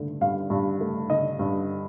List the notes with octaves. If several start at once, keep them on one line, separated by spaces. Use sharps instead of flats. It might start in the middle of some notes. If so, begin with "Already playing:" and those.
Already playing: G2 D3 A3
G2 F5
G2
A3
D3 D#5
G2